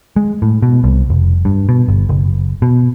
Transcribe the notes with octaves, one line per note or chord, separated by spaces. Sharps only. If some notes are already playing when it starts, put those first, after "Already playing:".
G#3
A2
B2
C2
F1
G2
B2
G1
F#1
B2